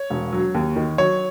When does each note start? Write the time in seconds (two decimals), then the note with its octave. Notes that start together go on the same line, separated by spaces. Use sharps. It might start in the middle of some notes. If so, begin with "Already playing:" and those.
Already playing: C#5
0.10 E1
0.32 F#3
0.55 D#2
0.76 D#3
0.98 F#3 C#5